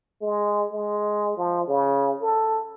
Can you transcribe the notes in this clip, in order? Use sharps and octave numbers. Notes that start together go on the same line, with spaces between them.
G#3
G#3
F3
C#3
A4